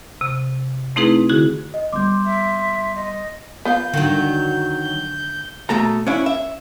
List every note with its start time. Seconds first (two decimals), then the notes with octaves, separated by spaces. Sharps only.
0.21 C3
0.96 A3 C4 D#4 E4 G#4 B4
1.29 D3 E4 F#4 G#4
1.74 D#5
1.93 G3 B3 C6 D6 G6
2.25 E5
2.96 D#5
3.65 B3 F4 F5 G6
3.93 D3 D#3 F#3
5.69 B2 A3 A4 A#5
6.06 C#4 D4 E4
6.26 E5